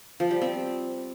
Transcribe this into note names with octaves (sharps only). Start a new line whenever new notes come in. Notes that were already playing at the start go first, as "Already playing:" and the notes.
F3
G3
C4